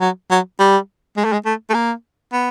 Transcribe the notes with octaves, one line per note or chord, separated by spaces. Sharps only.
F#3
F#3
G3
G#3
A3
G#3
A3
A3
A#3
B3